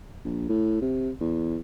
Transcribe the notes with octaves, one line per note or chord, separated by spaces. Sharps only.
A#1
A2
C3
E2